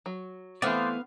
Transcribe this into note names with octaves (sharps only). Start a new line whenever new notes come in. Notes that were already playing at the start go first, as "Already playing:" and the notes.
F#3
E3 A3 B3 C4 C5 D5 F5